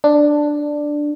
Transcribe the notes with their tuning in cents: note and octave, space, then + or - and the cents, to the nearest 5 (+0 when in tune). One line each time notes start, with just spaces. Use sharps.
D4 +5